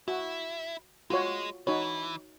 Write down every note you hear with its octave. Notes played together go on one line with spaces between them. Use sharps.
E4 F#4
G#3 F4 F#4 C#5
E3 D#4 F#4 C#5